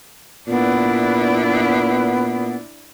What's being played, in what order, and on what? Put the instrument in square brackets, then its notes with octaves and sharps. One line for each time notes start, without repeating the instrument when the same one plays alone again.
[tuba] A#2 [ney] B3 [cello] D4 E4